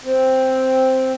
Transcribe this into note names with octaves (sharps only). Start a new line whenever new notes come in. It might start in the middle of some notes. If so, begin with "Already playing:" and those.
C4